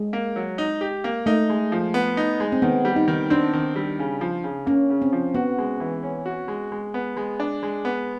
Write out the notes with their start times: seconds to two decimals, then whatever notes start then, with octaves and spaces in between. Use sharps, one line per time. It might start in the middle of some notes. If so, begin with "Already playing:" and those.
Already playing: G#3
0.13 A#3
0.36 F#3
0.58 D#4
0.81 G4
1.04 A#3
1.26 A3 D#4
1.50 G#3
1.72 F3
1.94 B3
2.17 D#4
2.40 G#3
2.52 C4
2.62 D#3 B3
2.85 G3
2.96 D#4
3.08 D#3
3.30 C4 D4
3.53 D#3
3.76 G3
3.99 C#3
4.21 F3
4.44 C#3
4.66 A#3 C#4
4.90 C#3
5.02 C4
5.13 F3
5.34 B3 F#4
5.58 G#3
5.80 E3
6.03 C#4
6.26 F#4
6.48 G#3
6.72 G#3
6.94 B3
7.17 G#3
7.40 D4
7.63 G#3
7.85 B3